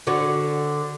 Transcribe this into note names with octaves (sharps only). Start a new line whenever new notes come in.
D3 F#4 C#5